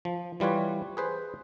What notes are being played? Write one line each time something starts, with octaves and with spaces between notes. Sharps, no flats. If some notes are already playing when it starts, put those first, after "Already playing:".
F3
E3 G3 F4 B4 C#5
G#4 B4 C5